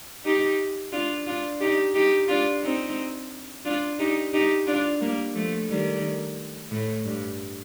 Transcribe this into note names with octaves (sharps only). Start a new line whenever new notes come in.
D#4 G4
D4 F4
D4 F4
D#4 G4
D#4 G4
D4 F4
C4 D#4
D4 F4
D#4 G4
D#4 G4
D4 F4
G3 A#3
F3 A3
D#3 G3
A2
G2